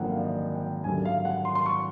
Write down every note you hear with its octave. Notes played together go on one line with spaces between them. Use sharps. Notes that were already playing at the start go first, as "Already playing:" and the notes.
Already playing: G#1 F#2 D3 F3 A#3 F#5 G5
F5
D5
D#5
G5
G#1 F#2 D3 G3 G#5
F5
F#5
C6
C6
C#6